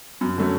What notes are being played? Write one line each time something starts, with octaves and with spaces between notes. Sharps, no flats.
F#2
D3 F#3 A3 C#4